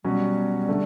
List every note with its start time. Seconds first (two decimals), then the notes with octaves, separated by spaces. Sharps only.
0.04 B2 F#3 G3 C#4
0.69 D3 A3